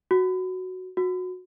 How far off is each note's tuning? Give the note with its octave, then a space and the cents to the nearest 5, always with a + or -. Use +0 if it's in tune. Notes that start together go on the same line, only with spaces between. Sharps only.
F#4 +0
F#4 -20